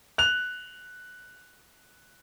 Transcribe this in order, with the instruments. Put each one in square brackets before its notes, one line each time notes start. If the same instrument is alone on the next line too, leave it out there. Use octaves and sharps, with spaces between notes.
[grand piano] F#6 F7